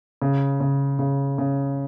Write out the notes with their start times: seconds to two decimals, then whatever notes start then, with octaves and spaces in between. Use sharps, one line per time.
0.22 C#3
0.60 C#3
0.99 C#3
1.38 C#3